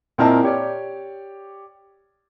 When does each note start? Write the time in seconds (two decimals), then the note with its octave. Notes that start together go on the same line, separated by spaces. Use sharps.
0.18 A#2 C4 E4 A#4 D#5 A5
0.43 G4 C#5 D5